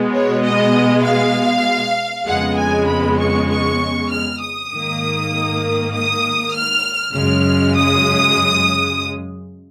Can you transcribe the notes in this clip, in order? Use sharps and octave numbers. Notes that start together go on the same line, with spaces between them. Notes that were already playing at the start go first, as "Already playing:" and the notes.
Already playing: B2 G#3 B3
C#5
D#5
F5
F2 C#3 G#3 B3 F#5
G#5
B5
C#6
C#6
F6
D#6
G#2 D#3 A#3
D#6
F6
F#2 C#3 G#3 F6
D#6